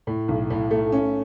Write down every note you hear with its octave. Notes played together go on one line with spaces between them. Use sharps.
A2
B1
A2
A3
C#4